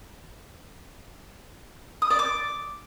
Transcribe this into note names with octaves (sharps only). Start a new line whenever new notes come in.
D#6
D5
D6